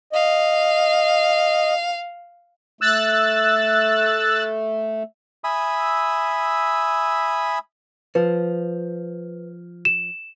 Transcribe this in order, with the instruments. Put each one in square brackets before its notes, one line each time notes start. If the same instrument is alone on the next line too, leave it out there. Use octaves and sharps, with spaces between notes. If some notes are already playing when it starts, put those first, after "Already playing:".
[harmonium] D#5 [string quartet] F5
[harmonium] A3 [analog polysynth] E6 F#6 A6
[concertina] E5 G#5 B5 D#6 E6
[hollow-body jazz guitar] F3 [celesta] B4
[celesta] E7